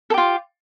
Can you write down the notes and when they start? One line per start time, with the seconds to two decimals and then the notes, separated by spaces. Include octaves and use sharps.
0.10 A4
0.14 G4
0.18 F4